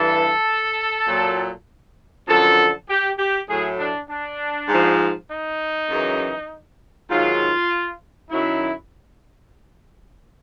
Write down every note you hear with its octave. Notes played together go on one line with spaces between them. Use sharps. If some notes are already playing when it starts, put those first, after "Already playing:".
Already playing: G2 E3 A4
A#2 F#3
F#2 D3 F3 A4
G4
G4
A2 F#3 G#4
D4
D4
G#2 F3
D#4
F#2 C#3 E3
G#2 D#3 F#3 F4
F#2 D#3 F#3 E4